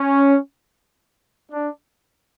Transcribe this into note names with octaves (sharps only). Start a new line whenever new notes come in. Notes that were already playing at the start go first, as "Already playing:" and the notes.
Already playing: C#4
D4